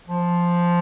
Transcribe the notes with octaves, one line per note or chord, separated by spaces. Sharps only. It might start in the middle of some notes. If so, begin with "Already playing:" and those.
F3